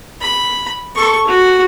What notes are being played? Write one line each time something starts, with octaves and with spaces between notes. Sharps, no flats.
B5
A4 C#6
F#4